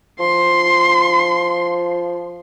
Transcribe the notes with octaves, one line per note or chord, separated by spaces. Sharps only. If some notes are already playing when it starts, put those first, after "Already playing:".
F3 C6